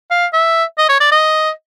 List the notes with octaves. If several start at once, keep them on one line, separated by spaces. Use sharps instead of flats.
F5
E5
D#5
C#5
D5
D#5